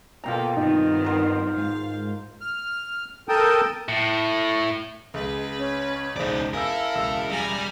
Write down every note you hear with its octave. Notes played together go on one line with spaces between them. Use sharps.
B2 A#3 F4 A4 G5 A#5
G2 D#3 B3 C4 D#4
A#4 C5
G#2 F5
F6
A4 A#4 G5 A5 D#6
A2
C#2 G#4 B4
C#4
E1 C#2 D#4 C5 D5
E4 A4 A#4 F5 G#5 E6
E1 C#2 E6
G3 G#5 A#5